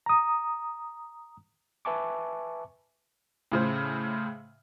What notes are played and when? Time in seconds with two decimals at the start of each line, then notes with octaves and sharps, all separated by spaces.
0.06 A#5 D#6
1.85 B4 E5 G#5 A5 C#6 D6
3.52 A2 C#3 C5